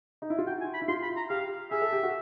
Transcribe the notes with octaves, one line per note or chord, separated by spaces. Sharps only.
D#4
E4
F4
F#4 G5
G#5
B5
E4
F4 C6
B5
A#5
G4 F5
G#4 E5
A4
G4
F#4